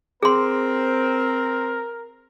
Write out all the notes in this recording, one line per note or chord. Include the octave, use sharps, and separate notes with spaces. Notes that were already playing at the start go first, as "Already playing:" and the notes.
C4 G#4 A#4 C6